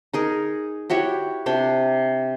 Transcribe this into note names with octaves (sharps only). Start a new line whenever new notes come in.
D#4 G#4 A#4
E4 F#4 G4 C#5
C3 D4 G5